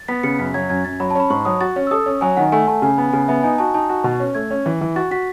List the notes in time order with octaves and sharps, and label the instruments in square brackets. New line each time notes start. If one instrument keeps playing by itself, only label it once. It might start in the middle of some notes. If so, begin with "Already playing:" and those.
Already playing: [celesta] A6
[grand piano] B3 [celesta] B6
[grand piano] C#3 [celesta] C#7
[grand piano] F#2 [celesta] B6
[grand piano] F#3 [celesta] G#6
[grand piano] F#2 [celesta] G#6
[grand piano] F#2 [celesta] A6
[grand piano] F#3 [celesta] B5
[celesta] A5
[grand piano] C#4 [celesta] B5
[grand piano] G#2 [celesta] C#6
[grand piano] F#3 [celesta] D#6
[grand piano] F#4 [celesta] A6
[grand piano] C#4
[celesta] E6
[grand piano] A4 [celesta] D#6
[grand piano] C#4
[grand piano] F#3 [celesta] G#5
[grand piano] D#3 [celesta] F#5
[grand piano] A3 [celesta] G#5
[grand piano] A3 [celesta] A5
[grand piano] C#3 [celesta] G#5
[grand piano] B3
[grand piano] C#3 [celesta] G#5
[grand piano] B3 [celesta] E5
[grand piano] D#4 [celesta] G#5
[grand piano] F#4 [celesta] A5
[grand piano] D#4 [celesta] A5
[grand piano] F#4
B2
C#4
[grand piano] A3 [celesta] G#6
[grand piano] C#4
E3
E3
[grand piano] F#4 [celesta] A6
[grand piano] F#4 [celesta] B6